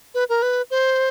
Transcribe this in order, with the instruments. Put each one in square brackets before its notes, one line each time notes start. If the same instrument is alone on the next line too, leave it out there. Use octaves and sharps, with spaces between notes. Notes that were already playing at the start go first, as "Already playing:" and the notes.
[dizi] B4
A#4
B4
C5